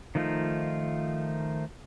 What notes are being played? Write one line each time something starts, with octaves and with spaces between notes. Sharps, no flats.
D#3 F3 A3 D#4 F4